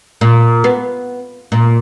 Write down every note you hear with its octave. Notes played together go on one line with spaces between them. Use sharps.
A#2
B3
A#2